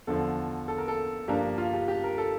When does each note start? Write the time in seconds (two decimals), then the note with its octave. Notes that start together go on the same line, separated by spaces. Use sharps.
0.07 E2 D3 F3 A4
0.68 A4
0.78 A#4
0.88 A4
1.28 G2 F3 A#3 D4 G4
1.58 F4
1.73 G4
1.88 G4
2.04 A#4
2.18 A4